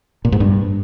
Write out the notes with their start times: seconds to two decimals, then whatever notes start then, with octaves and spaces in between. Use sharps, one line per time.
0.25 A#2
0.32 G#2
0.40 G2